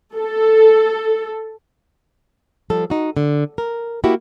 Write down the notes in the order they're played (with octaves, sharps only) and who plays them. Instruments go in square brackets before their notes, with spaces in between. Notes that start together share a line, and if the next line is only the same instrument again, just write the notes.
[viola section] A4
[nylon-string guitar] F3 G3 A4
D#4 F#4
D3
A#4
A#3 E4 F#4 G4